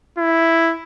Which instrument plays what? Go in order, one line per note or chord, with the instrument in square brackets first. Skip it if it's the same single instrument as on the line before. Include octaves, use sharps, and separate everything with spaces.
[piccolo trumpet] E4